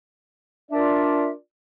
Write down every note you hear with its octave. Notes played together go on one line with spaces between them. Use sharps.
D4 F4 A#4 D5 E5